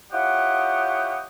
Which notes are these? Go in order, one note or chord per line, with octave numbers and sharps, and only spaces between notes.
E4 F4 G4 C#5 D#5 F#5